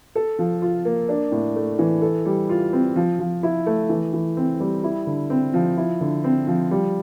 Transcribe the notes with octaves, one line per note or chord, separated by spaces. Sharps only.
A4
F3
F4
A#3
D4
A2
A3
E3
A4
G3
F4
C4
F3
F3
E4
A3
E3
E3
C4
G3
E4
D3
C4
F3
E4
D3
C4
F3
G3